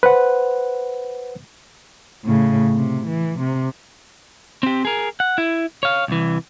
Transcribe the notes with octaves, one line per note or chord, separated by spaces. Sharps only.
B4 C5 F#5
A2 C#3
C3
E3
C3
C4 G4
G#4 A#4
F#5
E4
C#5 F5
C2 E3